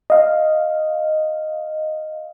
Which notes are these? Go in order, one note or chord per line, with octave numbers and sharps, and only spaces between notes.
D#5 F5